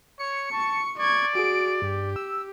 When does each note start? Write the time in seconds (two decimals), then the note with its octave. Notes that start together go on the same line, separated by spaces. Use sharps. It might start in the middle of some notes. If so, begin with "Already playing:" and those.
0.19 C#5 C#7
0.52 A5 C#6
0.98 D5 C#6 G#6
1.35 F#4 G#4 D7
1.82 G2 G4
2.16 E6